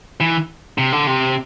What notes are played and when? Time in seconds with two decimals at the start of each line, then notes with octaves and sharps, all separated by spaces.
0.20 E3
0.78 C3
0.92 D3
1.07 C3